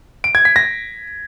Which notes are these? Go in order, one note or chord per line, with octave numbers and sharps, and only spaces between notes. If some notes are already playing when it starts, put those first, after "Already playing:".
D7
G#6
B6
A#6